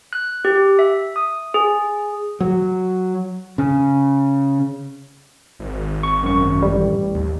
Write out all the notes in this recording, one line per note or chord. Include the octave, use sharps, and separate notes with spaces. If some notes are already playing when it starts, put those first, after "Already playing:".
F#6
G4
E5
D#6
G#4
F#3
C#3
G#1
C#6
F#2 C#6
A1 G3
D#2